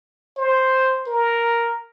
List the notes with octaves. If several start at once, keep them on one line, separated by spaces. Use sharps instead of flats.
C5
A#4